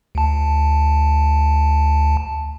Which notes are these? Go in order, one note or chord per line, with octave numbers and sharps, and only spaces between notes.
D2 A5